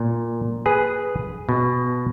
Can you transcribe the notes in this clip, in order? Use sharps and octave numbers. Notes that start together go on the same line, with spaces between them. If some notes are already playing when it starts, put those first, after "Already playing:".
Already playing: A#2
G#4 B4
B2